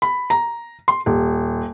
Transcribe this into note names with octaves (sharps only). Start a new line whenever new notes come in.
B5
A#5
C6
D#1